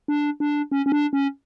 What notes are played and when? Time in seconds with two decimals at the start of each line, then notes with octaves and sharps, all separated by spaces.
0.08 D4
0.40 D4
0.72 C#4
0.86 C#4
0.92 D4
1.13 C#4